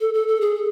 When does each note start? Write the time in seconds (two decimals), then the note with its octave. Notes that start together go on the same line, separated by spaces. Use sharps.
0.01 A4
0.14 A4
0.28 A4
0.41 G#4